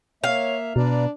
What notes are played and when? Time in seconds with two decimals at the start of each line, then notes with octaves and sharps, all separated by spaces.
0.24 A#3 C#5 E5 F5
0.76 B2 D4 B4 D5 A#5